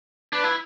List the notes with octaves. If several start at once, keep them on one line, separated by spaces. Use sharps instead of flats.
D4 B4
E4